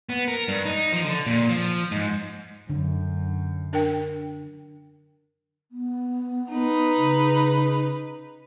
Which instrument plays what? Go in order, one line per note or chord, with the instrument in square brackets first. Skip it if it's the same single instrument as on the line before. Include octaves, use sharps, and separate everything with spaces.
[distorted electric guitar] B3
A#4
G2
D#4
F3
D3
A#2
F3
G#2
[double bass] F#2 [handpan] D3
[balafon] D4 A#4 G5
[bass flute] B3
[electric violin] D#4 B4
[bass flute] C#3